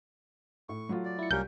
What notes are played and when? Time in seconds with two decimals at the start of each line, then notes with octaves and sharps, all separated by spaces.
0.69 A2 C#6
0.89 F#3 A3 F4
1.05 D5
1.19 E4 C#7
1.31 C2 G3 A#3 C#4 A#4 G6